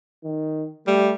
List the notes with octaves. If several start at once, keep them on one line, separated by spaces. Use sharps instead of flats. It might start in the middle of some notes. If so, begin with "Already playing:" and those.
D#3
G3 A3